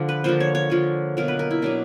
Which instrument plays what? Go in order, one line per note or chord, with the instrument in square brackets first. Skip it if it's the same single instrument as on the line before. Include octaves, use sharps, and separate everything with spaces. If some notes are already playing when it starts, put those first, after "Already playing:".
Already playing: [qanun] D3 F3 D5
B4
D3 F3 A#3 C5
C#5
C#5
D3 F3 A#3
B2 F#3 A#3 A#4
B4
A#4
E4
B2 F#3 A#3 D4